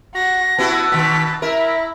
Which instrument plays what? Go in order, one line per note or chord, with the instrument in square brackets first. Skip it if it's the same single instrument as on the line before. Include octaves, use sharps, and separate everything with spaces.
[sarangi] F#4 [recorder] A#6
[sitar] B3 E4 F#4 [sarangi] A5
[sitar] B2 D#3 [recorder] B6
[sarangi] E4 [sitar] A#4 [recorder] E5